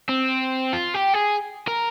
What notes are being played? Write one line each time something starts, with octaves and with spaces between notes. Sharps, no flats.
C4
F4
G4
G#4
A#4